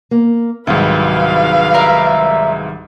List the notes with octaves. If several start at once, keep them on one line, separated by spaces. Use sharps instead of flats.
A#3
C2 G#2 D#3 F#3 B4 F5
A#4 D5 E5